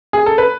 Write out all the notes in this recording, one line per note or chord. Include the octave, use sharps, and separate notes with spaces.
G#4
A4
B4